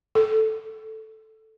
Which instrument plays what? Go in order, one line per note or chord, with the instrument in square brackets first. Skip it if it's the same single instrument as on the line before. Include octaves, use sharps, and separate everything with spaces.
[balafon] A4